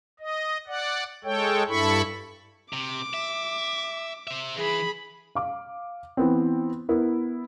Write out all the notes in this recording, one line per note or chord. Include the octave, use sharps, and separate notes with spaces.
D#5
D5 F#5
G#3 A4 C#5 G5
G2 E4 A4 B5 C#6
C3 D6
E5
C5 E5
E3 G#4 B5
F5 D6
E3 B3 C4
B3 E4 A#4